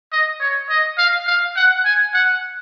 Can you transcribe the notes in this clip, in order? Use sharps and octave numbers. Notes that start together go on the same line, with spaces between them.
D#5
C#5
D#5
F5
F5
F#5
G#5
F#5